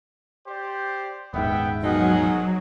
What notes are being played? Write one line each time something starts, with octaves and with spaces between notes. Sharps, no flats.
G4 C5 D5
D#1 G#2 B3 E5 G5
B2 F3 F#3 D#4 G#4 A#4 F#5